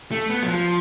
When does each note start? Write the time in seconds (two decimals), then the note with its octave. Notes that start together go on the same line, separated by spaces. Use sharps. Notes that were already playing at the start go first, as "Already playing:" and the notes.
0.11 A3
0.30 B3
0.43 F#3
0.48 F3